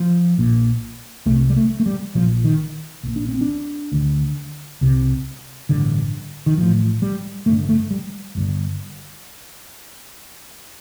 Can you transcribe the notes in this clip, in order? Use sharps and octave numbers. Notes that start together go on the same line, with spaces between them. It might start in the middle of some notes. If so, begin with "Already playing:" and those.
Already playing: F3
A#1 A#2
C2 C3 A3
G3
A3
A3
G3
A#1 A#2 F3
D#3
A#1 A#2
D4
C4
D4
D2 D3
C2 C3
A1 G2 D3
D#3
A1 A2 F3
G3
G1 G2 D3 A3
A3
G3
G1 G2 D3